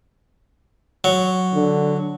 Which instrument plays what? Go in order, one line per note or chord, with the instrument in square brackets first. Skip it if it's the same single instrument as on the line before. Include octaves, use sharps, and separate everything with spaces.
[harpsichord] F#3
[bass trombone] D3